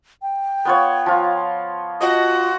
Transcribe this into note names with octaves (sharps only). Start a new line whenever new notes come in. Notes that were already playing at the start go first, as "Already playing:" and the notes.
G5
B3 F4 C#5
F3 F4
F4 F#4 D#5